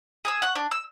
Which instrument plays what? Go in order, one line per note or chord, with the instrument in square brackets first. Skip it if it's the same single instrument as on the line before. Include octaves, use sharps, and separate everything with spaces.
[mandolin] G#4 G#5 E6
F#5 C#6
D4
E6